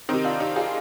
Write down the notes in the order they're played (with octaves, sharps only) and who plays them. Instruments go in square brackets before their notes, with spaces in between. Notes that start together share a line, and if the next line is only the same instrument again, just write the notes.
[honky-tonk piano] C3 D#3 C4 D#4
D4 F4
D#4 G4
F4 G#4